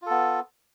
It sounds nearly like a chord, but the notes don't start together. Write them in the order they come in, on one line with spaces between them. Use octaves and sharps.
F4 A4 B3